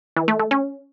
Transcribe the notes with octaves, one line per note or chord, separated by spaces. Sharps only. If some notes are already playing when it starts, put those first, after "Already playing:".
E3
A3
A3
C#4